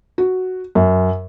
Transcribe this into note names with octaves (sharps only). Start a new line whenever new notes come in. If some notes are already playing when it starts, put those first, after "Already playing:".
F#4
F#2